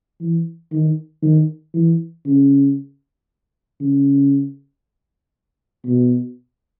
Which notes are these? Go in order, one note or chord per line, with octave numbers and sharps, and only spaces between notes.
E3
D#3
D#3
E3
C#3
C#3
B2